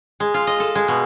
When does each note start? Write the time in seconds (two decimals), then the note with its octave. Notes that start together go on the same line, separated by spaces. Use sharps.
0.20 G#3
0.34 F4
0.47 D#5
0.60 A4
0.75 G#3
0.88 B2